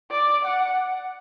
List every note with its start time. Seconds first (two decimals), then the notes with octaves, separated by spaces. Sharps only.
0.11 D5
0.44 F#5